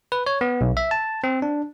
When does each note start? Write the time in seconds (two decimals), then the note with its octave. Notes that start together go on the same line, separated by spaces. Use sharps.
0.12 B4
0.26 C#5
0.41 B3
0.61 B1
0.77 E5
0.91 A5
1.24 C4
1.42 D4